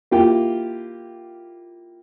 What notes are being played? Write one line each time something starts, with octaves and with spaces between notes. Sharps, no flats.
A#3 E4 F4 G4 G5